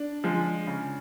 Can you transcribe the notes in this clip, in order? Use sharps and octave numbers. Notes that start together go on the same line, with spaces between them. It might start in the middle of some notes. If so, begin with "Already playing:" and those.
Already playing: D4
F3 G#3
C#3